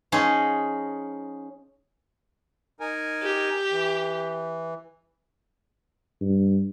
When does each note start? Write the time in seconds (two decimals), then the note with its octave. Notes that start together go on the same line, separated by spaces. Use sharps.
0.12 F3 C#4 D#4 G#4
2.80 D#4 A#4 G#5
3.23 G4
3.71 E3
6.21 G2